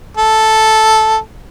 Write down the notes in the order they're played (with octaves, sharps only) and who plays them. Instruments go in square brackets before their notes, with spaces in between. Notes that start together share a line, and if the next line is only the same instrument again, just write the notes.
[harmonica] A4